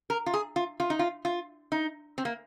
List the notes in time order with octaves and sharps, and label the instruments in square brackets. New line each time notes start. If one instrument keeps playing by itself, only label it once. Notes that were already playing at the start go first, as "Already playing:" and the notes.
[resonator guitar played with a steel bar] A#4
F4
G#4
F4
F4
D#4
F4
F4
D#4
C4
A#3